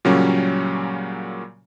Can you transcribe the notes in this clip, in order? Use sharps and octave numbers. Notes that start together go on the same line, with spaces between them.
A#2 C#3 F#3 G3 A#3 C#4